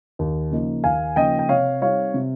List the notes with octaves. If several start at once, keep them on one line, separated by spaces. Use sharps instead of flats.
D#2
C#3 F3 A#3 D#4
D#2 F5 G#5
C#3 F3 A#3 D#4 D#5 G5
G5
C3 C#5 F5
G3 C4 D#4 C#5 F5
C3